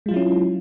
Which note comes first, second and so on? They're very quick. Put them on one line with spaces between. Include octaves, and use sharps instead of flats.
G#3 F4 F#3 E4 C#4